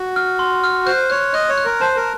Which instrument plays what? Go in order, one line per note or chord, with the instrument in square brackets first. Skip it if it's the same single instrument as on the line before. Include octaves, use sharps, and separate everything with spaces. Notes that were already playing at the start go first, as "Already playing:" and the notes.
Already playing: [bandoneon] F#4
[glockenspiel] F6
C6
F6
[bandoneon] C5 [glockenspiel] F#6
[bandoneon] C#5 [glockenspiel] F#6
[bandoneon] D#5 [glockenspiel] F#6
[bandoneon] C#5
[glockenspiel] F#6
[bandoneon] A#4
[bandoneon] C5 [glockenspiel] A5
[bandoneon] A#4